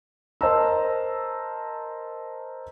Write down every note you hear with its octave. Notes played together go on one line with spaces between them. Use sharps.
A#4 C5 D#5 A5 A#5 E6